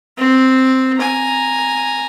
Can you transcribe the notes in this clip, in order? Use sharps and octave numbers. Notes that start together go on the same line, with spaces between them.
C4
G#5 A#5